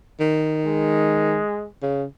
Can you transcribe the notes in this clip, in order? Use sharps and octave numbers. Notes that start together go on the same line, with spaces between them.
D#3
G#3
C#3